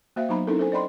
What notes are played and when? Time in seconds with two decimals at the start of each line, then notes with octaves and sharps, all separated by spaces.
0.16 A#3 F#4 C5 E5 F5
0.29 F#3 B3 D#4 C5 A#5 B5
0.47 C4 C#4 D#4 E4 A4 A#4
0.59 A4 C5 G#5
0.72 C5 D5 D#5 G5 B5 C6